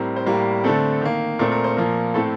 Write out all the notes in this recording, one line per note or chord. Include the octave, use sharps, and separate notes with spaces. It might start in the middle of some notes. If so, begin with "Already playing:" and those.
Already playing: A2 G3 C4 A#4
C5
A2 G3 A#3 A#4
D3 A3 C4 A4
D#3 A#3
A#2 A3 C4 A#4
A#4
C5
A#2 F3 A#3 A#4
A2 A3 C4 A4